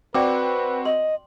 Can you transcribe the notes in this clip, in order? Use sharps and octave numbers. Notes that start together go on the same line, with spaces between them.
C4 F#4 B4 D5 G5 D6
D#5 C6